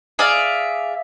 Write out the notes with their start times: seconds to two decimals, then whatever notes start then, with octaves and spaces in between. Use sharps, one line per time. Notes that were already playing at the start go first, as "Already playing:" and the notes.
0.19 G#4 D5 E5 F5